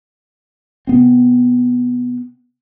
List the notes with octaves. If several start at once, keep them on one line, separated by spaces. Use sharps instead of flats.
C3 B3 C4